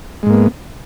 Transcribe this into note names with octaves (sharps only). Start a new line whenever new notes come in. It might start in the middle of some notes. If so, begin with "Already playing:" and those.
G#2 G#3 A#3 B3